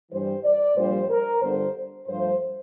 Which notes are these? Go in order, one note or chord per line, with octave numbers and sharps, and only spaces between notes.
G2 E3 G3 C5
D5
A#1 A#2 G3 C5
A#4
G1 G2 D3 C5
G2 F3 A3 C5